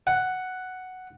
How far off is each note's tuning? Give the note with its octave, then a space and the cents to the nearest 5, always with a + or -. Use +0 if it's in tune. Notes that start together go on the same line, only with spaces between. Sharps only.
F#5 +5